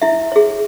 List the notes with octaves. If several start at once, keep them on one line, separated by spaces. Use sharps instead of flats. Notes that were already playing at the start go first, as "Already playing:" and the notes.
E4 E5
G#4 C#5